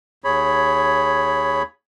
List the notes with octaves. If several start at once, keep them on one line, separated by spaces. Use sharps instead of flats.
D#2 G#4 C#5 B5